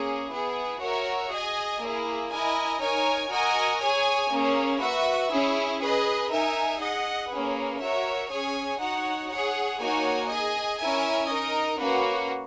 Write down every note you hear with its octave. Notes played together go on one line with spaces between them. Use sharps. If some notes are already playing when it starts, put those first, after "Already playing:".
Already playing: A#3 C#4 G#4
B3 E4 G#4
F#4 A#4 C#5 E5
G#4 D#5 G#5
A#3 E4 G#4
E4 A#4 D#5 G#5
D#4 A#4 C#5 G#5
F#4 A#4 D#5 G#5
G#4 C#5 G#5
A#3 C#4 G#4
F#4 B4 E5
C#4 E4 G#4
G#4 B4 D#5
D#4 A#4 E5 G#5
G#4 D#5 F#5
A#3 C#4 G#4 B4
F#4 A#4 C#5 E5
C#4 G#4 C#5 G#5
D#4 F#4 C#5 F#5
G#4 C#5 F#5
A#3 D#4 F#4 C#5 G#5
G#4 D#5 G#5
C#4 E4 A#4 E5 G#5
D#4 A#4 D#5
A#3 C#4 F#4 B4